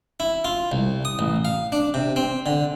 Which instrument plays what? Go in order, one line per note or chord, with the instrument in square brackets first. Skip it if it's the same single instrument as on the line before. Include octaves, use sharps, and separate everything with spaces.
[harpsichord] E4
F4
C2
D#6
A1
F5
D4
C3
C4
D3